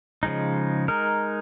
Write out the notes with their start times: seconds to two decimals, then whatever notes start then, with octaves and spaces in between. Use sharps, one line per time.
0.23 C#3 F3 G#3 D#4
0.88 G#3 D#4 A#4